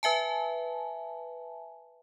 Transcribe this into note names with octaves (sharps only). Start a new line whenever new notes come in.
B4 E5 G#5 A5